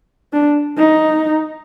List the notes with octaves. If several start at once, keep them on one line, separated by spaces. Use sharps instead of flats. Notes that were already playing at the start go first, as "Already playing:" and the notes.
D4
D#4